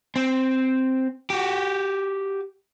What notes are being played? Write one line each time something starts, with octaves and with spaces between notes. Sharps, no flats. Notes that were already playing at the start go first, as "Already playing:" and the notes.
C4
F#4 G4